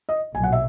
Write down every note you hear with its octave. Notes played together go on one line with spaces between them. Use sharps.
D#5
B1 A#2 F#3 G#5
F#5
E5